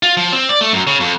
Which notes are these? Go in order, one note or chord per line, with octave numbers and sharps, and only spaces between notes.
F4
F3
C4
D5
A3
F#2
C#3
F2